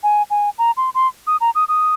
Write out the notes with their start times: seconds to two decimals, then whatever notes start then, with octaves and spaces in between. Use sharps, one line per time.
0.03 G#5
0.30 G#5
0.58 A#5
0.77 C6
0.94 C6
1.27 D#6
1.41 A#5
1.55 D#6
1.68 D#6